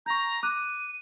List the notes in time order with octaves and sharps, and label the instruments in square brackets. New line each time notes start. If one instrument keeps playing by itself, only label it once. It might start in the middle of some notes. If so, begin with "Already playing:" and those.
[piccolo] A#5 [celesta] C#6 G6
[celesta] D6 F#6 [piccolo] D#7